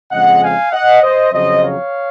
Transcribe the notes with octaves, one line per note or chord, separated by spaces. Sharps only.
F2 C#3 G#3 D#5 F#5
F5 G#5
D#5 F#5
C5 D#5
F2 C#3 F#3 C5 D#5
C#5 F5